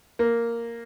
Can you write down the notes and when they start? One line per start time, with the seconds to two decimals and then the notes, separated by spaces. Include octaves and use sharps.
0.19 A#3